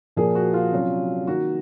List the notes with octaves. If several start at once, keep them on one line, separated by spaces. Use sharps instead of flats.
A#2 F3 A#3 G#4
F#4
F4
C3 F#3 C#4
D#3 A#3 D#4 F#4